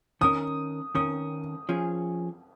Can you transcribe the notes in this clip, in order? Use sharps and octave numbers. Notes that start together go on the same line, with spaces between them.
D#3 C#4 A#4 D#6
D#3 C#4 A#4 D#6
F3 C#4 G#4